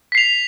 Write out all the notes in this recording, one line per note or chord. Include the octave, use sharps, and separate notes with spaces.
B6 C7 F7